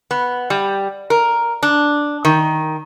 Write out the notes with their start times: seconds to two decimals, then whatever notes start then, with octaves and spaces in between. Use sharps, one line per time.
0.11 B3
0.50 G3
1.10 A#4
1.63 D4
2.25 D#3